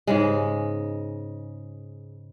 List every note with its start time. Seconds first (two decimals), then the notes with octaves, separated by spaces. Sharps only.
0.07 G#2 C#3 G#3